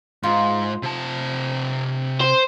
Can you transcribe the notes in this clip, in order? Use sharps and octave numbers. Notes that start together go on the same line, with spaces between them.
G#2 F4
C3 A5
C5